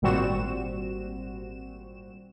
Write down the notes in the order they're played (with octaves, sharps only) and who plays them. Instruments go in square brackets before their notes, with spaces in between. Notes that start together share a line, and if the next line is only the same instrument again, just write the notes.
[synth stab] G#1 A#2 G3 C4 F#4 E7